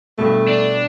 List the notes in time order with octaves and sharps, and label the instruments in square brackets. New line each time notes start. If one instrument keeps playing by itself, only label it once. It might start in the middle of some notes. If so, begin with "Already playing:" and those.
[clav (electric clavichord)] G2 B2 [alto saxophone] A3
[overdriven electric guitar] D4